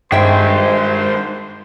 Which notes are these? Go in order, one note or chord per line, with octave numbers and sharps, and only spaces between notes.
G2 D#3 G#3 C5 E5 G5